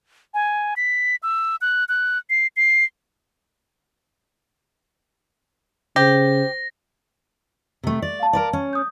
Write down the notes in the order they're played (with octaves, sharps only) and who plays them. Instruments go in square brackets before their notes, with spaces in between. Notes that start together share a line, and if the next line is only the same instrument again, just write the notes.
[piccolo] G#5
B6
E6
F#6
F#6
C7
C7
[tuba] C#3 [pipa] G4 [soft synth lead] C5 [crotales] A#6
[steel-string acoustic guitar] C3 A3
D5
[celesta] F5 A5
[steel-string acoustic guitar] A#4 B4 D5
C#4
[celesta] D#6 G6